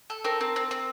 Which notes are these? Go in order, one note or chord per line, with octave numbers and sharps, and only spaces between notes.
A4
C4 A#4
C4
C4
C4